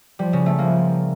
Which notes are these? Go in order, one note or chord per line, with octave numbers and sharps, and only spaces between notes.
F3 G3
C#3
A3
F3 A#3